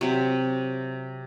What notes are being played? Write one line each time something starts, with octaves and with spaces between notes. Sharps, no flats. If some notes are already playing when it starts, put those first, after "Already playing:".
C3 F#3 B5